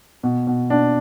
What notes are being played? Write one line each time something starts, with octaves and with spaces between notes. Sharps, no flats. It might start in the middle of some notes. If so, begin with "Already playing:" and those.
B2
B2
B2 D4